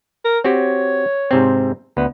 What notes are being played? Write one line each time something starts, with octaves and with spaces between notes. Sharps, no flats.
A#4
C4 F#4 G4 C#5
G#2 C3 C4
D2 B3